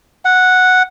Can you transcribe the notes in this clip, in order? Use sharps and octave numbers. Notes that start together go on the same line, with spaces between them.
F#5